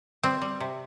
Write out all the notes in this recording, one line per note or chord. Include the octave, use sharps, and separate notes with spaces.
G3 C4
G3
C3